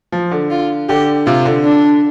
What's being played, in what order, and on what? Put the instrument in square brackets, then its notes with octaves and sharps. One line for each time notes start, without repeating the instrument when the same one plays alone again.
[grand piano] F3
D3
[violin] F4
[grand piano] D3 [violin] G4
[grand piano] C3 [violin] F4
[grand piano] D3
[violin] D4